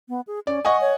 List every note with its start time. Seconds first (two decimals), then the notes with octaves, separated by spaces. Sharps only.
0.09 B3
0.27 G#4
0.47 C#4 D5
0.65 D#5 F#5 G#5 C#6
0.81 C#5